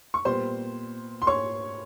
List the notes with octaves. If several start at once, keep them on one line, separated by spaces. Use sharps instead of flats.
C#6
A#2 G3 B3 C5 C6
C6
C#5 C#6